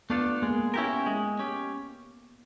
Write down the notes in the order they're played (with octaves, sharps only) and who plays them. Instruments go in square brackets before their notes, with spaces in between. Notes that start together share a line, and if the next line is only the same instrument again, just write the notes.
[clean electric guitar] A3 D4 F4 A4 [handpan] B3
[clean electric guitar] G#3 [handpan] A#3
[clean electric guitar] C#4 E4 G4 A#4
G#3
C#4 G4